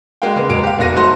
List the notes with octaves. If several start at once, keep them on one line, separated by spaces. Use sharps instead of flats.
G#3 A#3 F#4 F5 G5
C#3 G#3 A#3 B3
F#1 F#3 G#3 A#3 D7
G4 F5
F1 B2 A#3 F#4 A#6 D#7
F#3 A3 D#4 F#4 C5 C6